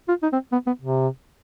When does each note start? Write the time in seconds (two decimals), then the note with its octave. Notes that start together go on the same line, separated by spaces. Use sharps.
0.09 F4
0.23 D#4
0.33 C4
0.52 B3
0.67 B3
0.82 C3